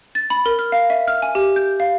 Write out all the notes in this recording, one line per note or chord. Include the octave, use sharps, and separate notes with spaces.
A6
B5
A#4
F6
F5
E5
F6
G#5
G4
G6
F5